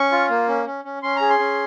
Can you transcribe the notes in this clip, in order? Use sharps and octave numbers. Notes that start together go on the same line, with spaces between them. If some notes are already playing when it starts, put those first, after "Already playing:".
Already playing: C#4 C#6
F4
A#3
C#4
C#4
C#4
C#4 C6
G#4 A#5
C6
C#4